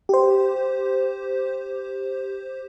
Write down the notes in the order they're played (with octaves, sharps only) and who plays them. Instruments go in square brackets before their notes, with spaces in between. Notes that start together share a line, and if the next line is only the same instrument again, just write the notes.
[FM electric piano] G4 C5